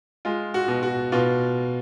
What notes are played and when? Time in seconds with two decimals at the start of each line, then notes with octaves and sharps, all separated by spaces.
0.25 G#3 F4
0.54 F#4
0.68 B2
0.83 F#4
1.12 B2 F4